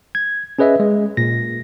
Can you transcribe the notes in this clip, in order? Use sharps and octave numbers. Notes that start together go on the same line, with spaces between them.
G#6
C#4 G#4 B4 D#5 E5
G#3
A#2 A#6